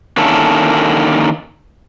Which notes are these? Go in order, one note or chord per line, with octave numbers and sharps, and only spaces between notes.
D3 D#3 A#3 C#4 E4 A4